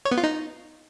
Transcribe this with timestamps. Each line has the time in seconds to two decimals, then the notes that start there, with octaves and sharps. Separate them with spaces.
0.05 C#5
0.11 B3
0.17 F4
0.24 D#4